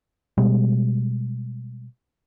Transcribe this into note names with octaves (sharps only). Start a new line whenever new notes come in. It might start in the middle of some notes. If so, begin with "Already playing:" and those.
B2 G3 G#3